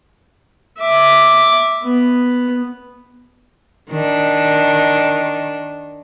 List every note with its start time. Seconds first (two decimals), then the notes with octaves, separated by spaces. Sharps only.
0.80 E5 D6
1.84 B3
3.90 D#3 D4